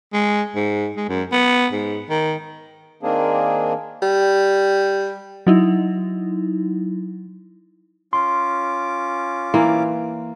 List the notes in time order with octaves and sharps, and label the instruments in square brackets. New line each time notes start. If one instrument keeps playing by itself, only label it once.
[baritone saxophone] G#3
G#2
G#3
F#2
B3
G#2
D#3
[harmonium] D#3 A#3 C4 D4 G#4
[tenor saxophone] G3
[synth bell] F#3 D#4 E4
[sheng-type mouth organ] C#4 F4 D6 [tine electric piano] C6
[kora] E3 A#3